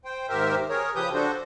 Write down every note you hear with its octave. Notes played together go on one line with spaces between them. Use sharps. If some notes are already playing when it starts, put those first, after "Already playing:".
C5 G5
D#2 G#2 G4 A#4 C5 E5
G#4 A#4 C#5
C#3 F3 G4 B4 D#6 G6
D4 F#4 A4 C5